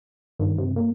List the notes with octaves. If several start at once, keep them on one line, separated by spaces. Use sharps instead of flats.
G2 D#3
C3
A#3